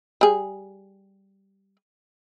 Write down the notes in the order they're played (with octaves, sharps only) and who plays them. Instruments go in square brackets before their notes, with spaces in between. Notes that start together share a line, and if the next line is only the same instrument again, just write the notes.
[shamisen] G3 G#4